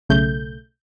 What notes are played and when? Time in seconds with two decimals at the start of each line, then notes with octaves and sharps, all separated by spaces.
0.09 B1 C#3 A3 G6